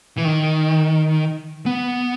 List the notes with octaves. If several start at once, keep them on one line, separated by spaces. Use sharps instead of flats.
E3
D#3
B3